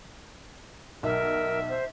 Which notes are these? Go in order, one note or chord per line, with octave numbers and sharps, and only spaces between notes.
B1 A#4 E5
C5